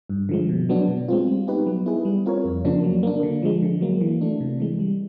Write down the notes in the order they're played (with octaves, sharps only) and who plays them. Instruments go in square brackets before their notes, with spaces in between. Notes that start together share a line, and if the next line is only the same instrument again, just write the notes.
[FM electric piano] G2
D3 F3 G#3
B2
F#3 B3 D4
B2
G#3 C4 F4
G3
B3 D#4 G4 B4
F#3
B3 E4 G#4 B4
G3
C4 F4 A#4 C#5
F2
C#3 F3 A#3 D4
F#3
A#3 D4
D3
F3 G#3
D3
F#3 A#3
E3
A3 D4
C3
E3 G#3
G3